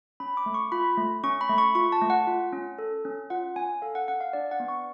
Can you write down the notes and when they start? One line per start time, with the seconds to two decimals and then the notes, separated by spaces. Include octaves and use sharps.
0.20 C#4 B5
0.37 D6
0.46 A3
0.54 C#6
0.72 F4 B5
0.97 A3
1.24 C#4 C#6
1.41 B5
1.49 A3
1.58 C#6
1.75 F4 C#6
1.92 A5
2.01 A3
2.10 F#5
2.27 F4
2.53 C#4
2.78 A4
3.05 C#4
3.30 F4 F#5
3.56 C#4 G#5
3.82 A4 F5
3.95 F#5
4.08 C#4 F#5
4.20 F5
4.33 D4 D5
4.51 F#5
4.60 B3
4.68 C#6